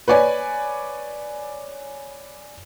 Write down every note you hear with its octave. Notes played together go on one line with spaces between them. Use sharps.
B4 C#5 D5 G#5